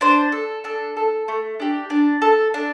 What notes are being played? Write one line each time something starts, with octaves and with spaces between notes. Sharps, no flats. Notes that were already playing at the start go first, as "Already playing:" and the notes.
D4 C5
A4
D4 A4
A4
A3
D4 G4
D4
A4
D4